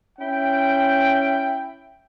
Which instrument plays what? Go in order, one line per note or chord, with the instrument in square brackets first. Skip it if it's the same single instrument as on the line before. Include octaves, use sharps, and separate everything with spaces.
[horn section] C#4 E4 G5